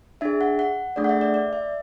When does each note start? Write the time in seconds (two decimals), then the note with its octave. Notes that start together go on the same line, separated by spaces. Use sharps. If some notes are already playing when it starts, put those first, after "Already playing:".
0.21 D4 G#4 E5
0.41 F#5
0.59 F#5
0.96 A3 D4 G#4 D5
1.04 F#5
1.09 E5
1.21 D5
1.34 D5
1.53 E5